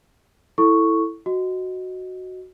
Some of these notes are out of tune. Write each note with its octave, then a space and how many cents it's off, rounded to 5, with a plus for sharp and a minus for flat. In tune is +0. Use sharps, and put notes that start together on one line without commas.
E4 +0 A4 +0 C#6 +0
F#4 +0 D#5 +0